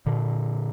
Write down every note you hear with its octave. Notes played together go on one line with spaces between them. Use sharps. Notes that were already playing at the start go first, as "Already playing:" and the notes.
A#2 D3